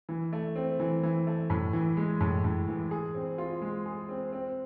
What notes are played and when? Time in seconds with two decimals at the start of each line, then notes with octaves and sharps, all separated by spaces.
0.09 E3
0.33 A3
0.56 C4
0.80 E3
1.03 E3
1.27 A3
1.50 A2
1.73 E3
1.97 G#3
2.21 A2
2.44 A2
2.68 E3
2.91 G#4
3.15 C4
3.38 F4
3.62 G#3
3.86 G#4
4.09 C4
4.33 C4